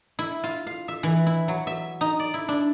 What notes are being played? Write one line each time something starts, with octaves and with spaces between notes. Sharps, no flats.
E4
F4
F5
E5
E3
E4
F#3
E5
D#4
D5
E4
D4